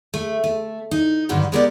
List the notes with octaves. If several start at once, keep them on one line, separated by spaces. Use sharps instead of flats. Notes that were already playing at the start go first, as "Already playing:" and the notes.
A3
A3
D#4
G2 D3 D#3 F#3 G3
G#3 B3 G4 A#4 C#5 D5